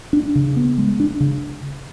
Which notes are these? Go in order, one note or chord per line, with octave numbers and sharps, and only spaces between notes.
D4
C#3
B3
G#3
D4
C#3